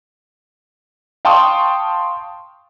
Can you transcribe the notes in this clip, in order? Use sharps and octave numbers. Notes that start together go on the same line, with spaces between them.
F5 G5 A5 C6 C#6 D#6